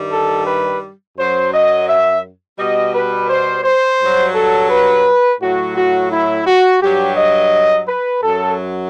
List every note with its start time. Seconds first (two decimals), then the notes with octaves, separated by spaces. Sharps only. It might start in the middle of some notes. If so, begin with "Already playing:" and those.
Already playing: G2 D#3 G3
0.12 A4
0.47 B4
1.17 F#2 F#3 C5
1.53 D#5
1.88 E5
2.58 B2 G3 D#5
2.94 B4
3.29 C5
3.64 C5
4.00 G2 F#3
4.34 A4
4.70 B4
5.40 A2 F#3 F#4
5.76 F#4
6.11 E4
6.47 F#4
6.82 G2 F#3 G4
7.17 D#5
7.87 B4
8.22 F#2 F#3 A4